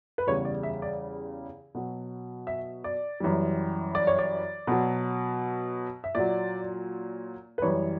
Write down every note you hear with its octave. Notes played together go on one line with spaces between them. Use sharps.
B4
E2 C#3 G3 C#5
D5
E5
D5
B2 F#3
E5
D5
F#2 E3 G3
D5
C#5
D5
B2 F#3
E5
A#2 F#3 D5
B4
F#2 E3 G3 C#5